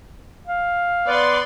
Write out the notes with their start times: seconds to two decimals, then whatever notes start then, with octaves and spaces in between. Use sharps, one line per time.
0.47 F5
1.08 B3 D5 C6